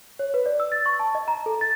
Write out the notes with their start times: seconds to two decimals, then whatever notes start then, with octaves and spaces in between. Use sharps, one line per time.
0.19 C#5
0.34 B4
0.46 D5
0.60 E6
0.72 A6
0.86 C#6
1.00 A5
1.15 D#5
1.28 A#5
1.46 A4
1.61 A6